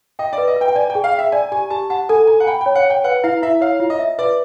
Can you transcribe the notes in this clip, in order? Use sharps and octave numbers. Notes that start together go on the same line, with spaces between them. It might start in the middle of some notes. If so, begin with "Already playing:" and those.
D#5 G5
B4 D5
D#5
B4 G5
G5
D5 G#5
G5
G#4
F5
E5 G5
D5 G#5
G4 G#5
G4 A5
F#5 A5
A4 G#5
G#5 A#5
F#5
G5 B5
G5
C#5
F#5
C#5 G5
B4 F#5
E4 F5
E4 E5
C#5 F5
F4
D#5
E5
B4 D5